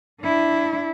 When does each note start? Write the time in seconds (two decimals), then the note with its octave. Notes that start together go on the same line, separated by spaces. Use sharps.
0.21 D4 E4